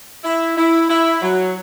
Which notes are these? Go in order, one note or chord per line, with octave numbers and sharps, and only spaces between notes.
E4
E4
E4
F#3